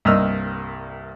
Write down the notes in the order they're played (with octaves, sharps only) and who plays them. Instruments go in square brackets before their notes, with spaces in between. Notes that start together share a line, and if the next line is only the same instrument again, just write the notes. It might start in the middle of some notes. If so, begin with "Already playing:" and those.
[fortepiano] C2 G2 A#3 D#5 E6 F6